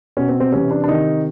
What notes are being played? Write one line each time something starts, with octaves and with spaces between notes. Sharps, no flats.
B2 C#4
C4
C4
C3 E3 C#4
D4
D4
C3 D#3 D#4